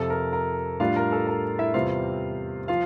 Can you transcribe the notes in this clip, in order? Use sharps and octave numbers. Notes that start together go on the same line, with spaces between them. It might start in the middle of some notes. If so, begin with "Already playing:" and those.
Already playing: F2 C3 F3 A4
A#4
A#4
A2 G3 D4 F4 F5
A#4
A4
A#4
E4 E5
E2 C3 G3 C4 F4 F5
F3 F4 F5